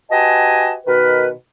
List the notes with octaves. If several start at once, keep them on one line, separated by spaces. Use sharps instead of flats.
F#4 G4 B4 D#5 G#5 A5
B2 D#3 A#4 B4